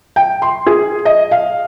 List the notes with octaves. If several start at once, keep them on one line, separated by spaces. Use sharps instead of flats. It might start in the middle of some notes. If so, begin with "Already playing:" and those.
G5
C6
G#4
D#5
F5